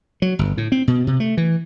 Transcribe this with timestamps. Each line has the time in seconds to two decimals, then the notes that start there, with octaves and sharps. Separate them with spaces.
0.22 F#3
0.39 G1
0.57 A2
0.72 C4
0.88 B2
1.07 C3
1.20 A3
1.37 E3